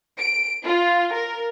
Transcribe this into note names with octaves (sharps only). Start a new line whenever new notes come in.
D7
F4
A#4